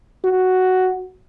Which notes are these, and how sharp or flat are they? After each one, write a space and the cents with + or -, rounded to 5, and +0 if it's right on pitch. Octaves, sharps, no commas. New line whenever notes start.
F#4 +5